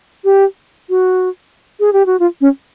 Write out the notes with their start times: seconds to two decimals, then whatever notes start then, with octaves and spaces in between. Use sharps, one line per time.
0.25 G4
0.90 F#4
1.80 G#4
1.93 G4
2.06 F#4
2.19 F4
2.41 C#4